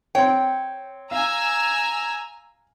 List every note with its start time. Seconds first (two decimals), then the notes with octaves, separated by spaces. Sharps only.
0.15 C4 C#5 G5
1.11 F5 G#5 A#5 E6